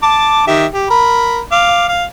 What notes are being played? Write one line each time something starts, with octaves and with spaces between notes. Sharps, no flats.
A5 D6
D#3 G4 E5
G4
A#4 B5
F5 D6
F5